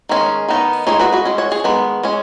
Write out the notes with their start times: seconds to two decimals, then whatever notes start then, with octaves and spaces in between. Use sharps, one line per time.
0.09 D#3 G#3 C#4
0.49 D#3 B3 D#4
0.87 G#3 B3 D#4 G#4 C#5
1.00 F#4 B4
1.12 F#4 B4
1.25 G#3 C#4
1.38 C#5 F#5
1.52 G#4 C#5
1.64 D#3 G#3 B3 B4
2.03 G#3 C#4